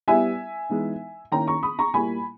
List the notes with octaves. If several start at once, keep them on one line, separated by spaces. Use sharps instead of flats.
G3 B3 E4 E5 G#5
E3 G#3 B3 D#4
D#3 A#3 C#4 E4 G5 A#5
A#5 C#6
B5 D#6
A#5 C#6
A#2 G3 A#3 E4 G#5 B5